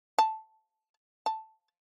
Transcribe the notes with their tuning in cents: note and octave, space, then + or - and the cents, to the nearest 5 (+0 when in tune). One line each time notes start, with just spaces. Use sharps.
A5 -5
A5 +0